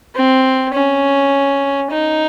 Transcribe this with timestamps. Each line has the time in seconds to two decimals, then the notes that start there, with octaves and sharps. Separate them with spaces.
0.15 C4
0.74 C#4
1.91 D#4